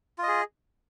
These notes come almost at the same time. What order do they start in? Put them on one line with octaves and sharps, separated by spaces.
F4 D#5 G#4